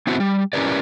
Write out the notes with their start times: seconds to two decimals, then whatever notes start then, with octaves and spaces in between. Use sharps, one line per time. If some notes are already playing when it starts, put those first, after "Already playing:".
0.07 B3 C4 E4 F#4 C5 E5
0.20 G3
0.53 C#4 E4 G4 A#4 B4 D5